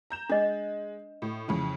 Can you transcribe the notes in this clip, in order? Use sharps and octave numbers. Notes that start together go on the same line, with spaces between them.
A#5 G6 E7
G#3 D4 D#5
A2
F2 C#3 E3